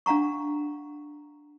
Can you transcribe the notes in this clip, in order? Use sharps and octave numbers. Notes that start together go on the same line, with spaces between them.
D4 F5 F#5 A#5 C#6